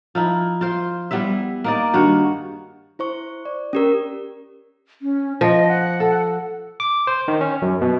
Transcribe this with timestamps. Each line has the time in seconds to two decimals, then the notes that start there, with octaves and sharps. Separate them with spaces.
0.15 F3 D#4 E4
0.61 F4 C5
1.11 G3 B3 E4 E5
1.64 A#3 D#4 D5
1.94 G2 D#3 F#4 C#5
2.99 E4 C5 C#6
3.45 D5
3.73 C#4 G4 A#4
5.02 C#4
5.41 F3 D#5
5.68 F#5
6.00 A4
6.80 D6
7.07 C5
7.28 D#3
7.41 C#4
7.62 F#2
7.81 B2